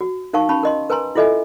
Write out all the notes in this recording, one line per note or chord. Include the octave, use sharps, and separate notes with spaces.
F#4
D#4 A#4 F5 A5 C#6
C#4 A5 B5 C#6
A#4 D#5 C6
A#4 B4 G#5 A#5 C6
E4 F4 A4 D#5 E5 G#5